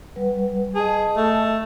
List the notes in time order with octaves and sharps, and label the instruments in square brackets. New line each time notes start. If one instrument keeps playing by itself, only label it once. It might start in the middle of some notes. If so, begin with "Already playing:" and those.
[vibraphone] G3 B4 F#5
[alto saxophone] G#4 [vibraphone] D#5 A5
[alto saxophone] A3